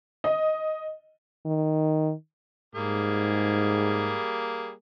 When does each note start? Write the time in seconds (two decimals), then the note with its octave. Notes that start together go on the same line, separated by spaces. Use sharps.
0.24 D#5
1.46 D#3
2.75 G#2 G3 A#3 G#4